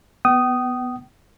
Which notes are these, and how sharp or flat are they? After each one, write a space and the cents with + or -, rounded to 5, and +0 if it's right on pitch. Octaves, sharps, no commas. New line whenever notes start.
B3 +0 G5 -45 D#6 -5